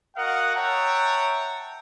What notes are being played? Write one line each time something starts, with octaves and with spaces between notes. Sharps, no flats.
F#4 A#4 D#5 F5 F#5
C#5 E5 F#5 G5 A5 A#5